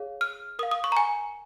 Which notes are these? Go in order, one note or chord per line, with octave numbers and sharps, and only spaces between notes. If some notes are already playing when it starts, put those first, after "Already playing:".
Already playing: G#4 C#5 F5
F6
A#4 F5 D#6
D#6
C#6
A#5
G#5